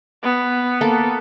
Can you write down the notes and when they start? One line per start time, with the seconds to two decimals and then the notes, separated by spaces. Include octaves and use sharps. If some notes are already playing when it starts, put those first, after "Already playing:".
0.23 B3
0.81 A#3 A4